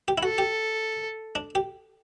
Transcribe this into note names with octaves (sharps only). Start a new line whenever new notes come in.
G4
E4
F#4 A4
G4
D4
G4